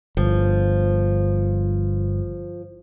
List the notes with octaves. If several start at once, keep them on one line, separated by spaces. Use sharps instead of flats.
G1 F3